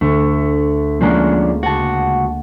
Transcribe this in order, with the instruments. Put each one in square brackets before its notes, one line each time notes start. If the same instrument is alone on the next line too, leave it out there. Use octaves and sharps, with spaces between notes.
[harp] D2 [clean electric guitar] A3
[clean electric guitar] F3 C#4 D4 [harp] G#3 A#3
[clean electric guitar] C#2 F#4 [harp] F#5 A5